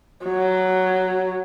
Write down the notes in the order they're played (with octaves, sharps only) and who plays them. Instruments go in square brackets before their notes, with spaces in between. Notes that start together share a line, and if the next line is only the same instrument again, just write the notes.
[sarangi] F#3